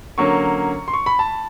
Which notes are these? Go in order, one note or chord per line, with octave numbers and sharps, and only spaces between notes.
D3 F#3 A#3 C#4 C#6
C6
C#6
B5
A5